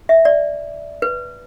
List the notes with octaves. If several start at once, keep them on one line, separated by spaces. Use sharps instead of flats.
E5
D5
B4